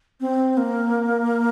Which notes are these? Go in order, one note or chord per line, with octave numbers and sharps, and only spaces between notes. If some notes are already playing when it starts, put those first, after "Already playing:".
C4
A#3